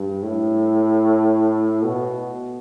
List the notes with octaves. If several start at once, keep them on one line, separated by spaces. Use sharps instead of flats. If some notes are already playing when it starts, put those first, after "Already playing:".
Already playing: G2
A2
B2